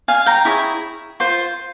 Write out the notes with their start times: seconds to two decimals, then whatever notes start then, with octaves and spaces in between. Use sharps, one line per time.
0.08 F5 G#5
0.26 G5 A#5
0.45 E4 G#4 C#5
1.20 F4 C5